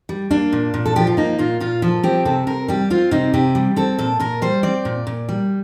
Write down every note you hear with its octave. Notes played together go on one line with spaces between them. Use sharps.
G3
A#3 D4
A#2
A#2
A4
F3 G4
F4
A#3 D#4
A#2 F4
A#2 F4
F3 A4
C4 G4
C3 A4
C3 A#4
G3 G4
C4 F4
C3 D#4
C3 G4
G3
C4 A4
A#2 A4
A#2 A#4
G3 C5
C4 D5
A#2
A#2
G3